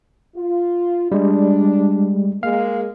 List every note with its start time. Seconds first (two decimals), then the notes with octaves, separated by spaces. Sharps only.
0.36 F4
1.12 G3 G#3 D4
2.43 G#3 A#3 F5